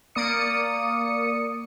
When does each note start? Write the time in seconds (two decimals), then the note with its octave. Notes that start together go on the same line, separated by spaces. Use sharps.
0.15 A#3 D5 D#6 C#7